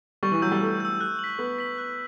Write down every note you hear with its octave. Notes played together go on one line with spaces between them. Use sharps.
G3 C#6
E3
F#3 E6 G6
G3
A3 C#6
E6 G6
F#6
B6 F#7
B3 F#6
B6 F#7
F#6